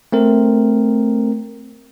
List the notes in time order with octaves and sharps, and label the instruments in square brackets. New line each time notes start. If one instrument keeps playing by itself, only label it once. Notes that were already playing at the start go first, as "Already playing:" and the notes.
[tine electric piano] A3 C4 A#4